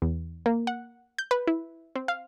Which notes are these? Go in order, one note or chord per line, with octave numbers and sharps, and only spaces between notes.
E2
A#3
F#5
G6
B4
E4
C4
F5